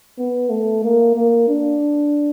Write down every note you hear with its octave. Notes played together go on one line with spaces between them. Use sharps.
B3
A3
A#3
A#3
D4